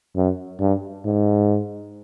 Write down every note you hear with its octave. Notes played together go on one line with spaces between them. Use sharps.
F#2
G2
G#2